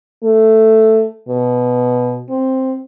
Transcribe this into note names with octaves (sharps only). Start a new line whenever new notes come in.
A3
B2
C4